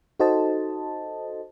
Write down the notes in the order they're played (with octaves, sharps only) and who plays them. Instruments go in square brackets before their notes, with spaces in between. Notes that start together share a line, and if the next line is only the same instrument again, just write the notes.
[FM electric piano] D#4 F#4 A4 C5 D#5 A5